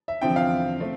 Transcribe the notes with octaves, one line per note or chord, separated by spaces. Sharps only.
E5
E2 D3 F3 C4 G5
F5
A3 C4